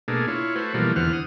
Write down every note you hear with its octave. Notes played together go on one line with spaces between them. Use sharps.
B2 A3 A#3 D4 G#4
E4 F4 C#5
A3 F#4 B4 C5
B2 E3 F3 G3 A3 A#3
E2 D3 E3 C5 F#5 F6
D#6